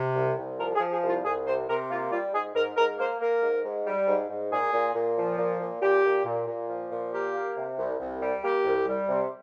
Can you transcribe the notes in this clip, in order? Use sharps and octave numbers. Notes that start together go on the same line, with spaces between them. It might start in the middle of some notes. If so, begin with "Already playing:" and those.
Already playing: C3
C2
C2
F3 A#4
G#4
F3
G#4
C2
F4
C2 G#4
C3 C5
C3 A#4
A#3 F4
G3 F4
G#2 G#4
G#2 A#4
G#2 A#4
A#3 C5
A#3 A#4
G#2
G#2
G3
G#2
G#2
A#2 G#4
A#2
A#2
F3
A#2
A#2
A#2 G4
A#2
A#2
A#2
F3
A#2
A#3 G4
A#3
C3
C2
C2
G3
A#3 G4
C2
G3
C3